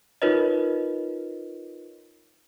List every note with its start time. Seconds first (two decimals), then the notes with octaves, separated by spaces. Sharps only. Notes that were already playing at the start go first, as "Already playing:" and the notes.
0.22 D#4 F4 A#4 B4 C#5 D#5